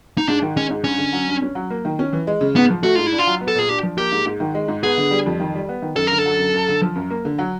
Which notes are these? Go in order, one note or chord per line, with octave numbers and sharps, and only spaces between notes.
D#4
G#2 D4
D#3
G#3 C#4
G#2
G2 C#4
D3
F#3
G2
C#4
F#3
A#3
D#3
C#4
E3
G#3
C#3
G#2 B3
F3
A3 F#4
G#2 F4
E4
D4
F4
F#3
B3
A4
A#2 G#4
D4 G4
F3
A#3 G4
G#2
G#2
D#3
G#3
G#2
B3 G#4
D3
G3
F2
D#3
G3
B3
D#3
F#2 A4
D3 A#4
A4
F#3
F#2
F#2
D3
F3
F#2
A#3
D3
F#3